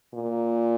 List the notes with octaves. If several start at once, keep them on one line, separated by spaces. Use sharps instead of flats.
A#2